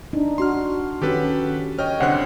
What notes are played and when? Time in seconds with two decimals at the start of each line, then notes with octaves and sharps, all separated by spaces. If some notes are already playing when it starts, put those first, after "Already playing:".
0.13 D4 D#4
0.38 D4 F#4 C6 F6
1.02 D#3 C#4 F#4 G4 A4 B4
1.79 C#5 D#5 G5 F6
2.00 C2 D3 C5 F#5 F#6